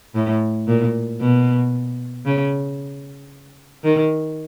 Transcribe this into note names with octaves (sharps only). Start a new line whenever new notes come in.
A2
A#2
B2
C#3
D#3